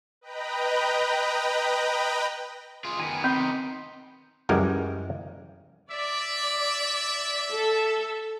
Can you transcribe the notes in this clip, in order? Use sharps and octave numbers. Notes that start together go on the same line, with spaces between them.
B4 D#5 G5 A#5 B5
F4 G#4
D#3 B3 G#5
C4 D#4 B5 C6
C#2 F#2 E3 G3 G#3 A#4
D5 E5
A4